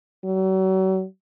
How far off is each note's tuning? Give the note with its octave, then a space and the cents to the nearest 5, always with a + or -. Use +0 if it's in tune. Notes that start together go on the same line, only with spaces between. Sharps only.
F#3 +40